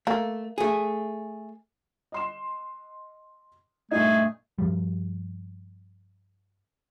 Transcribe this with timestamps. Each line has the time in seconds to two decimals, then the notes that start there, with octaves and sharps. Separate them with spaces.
0.07 A3 A#3
0.58 A3 G#4
2.12 D#5 C6 E7
3.91 G2 A#2 A3 D#4 G#4
4.58 G2 F3 G3